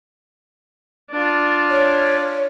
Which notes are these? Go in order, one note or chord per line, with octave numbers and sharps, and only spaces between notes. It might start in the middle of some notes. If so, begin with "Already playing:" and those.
D4 F4
C#5